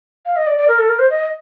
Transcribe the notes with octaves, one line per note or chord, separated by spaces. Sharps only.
F5
D#5
D5
D5
A#4
A4
A#4
C5
D#5